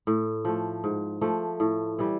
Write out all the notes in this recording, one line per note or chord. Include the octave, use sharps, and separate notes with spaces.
A2
F3 A3
G#2
F3 A3
A2
E3 G3